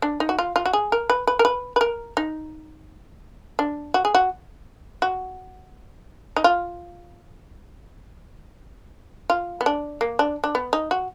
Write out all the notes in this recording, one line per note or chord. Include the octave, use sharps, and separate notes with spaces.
D4
D#4
F#4
F4
F4
F#4
G#4
A#4
B4
B4
A#4
B4
B4
A#4
D#4
D4
F#4
G#4
F#4
F#4
D#4
F4
F4
B3
D4
A#3
D4
D4
B3
D#4
F#4